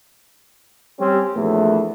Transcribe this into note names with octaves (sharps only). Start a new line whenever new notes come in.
G3 C4 C#4 G4
A#1 E2 E3 A3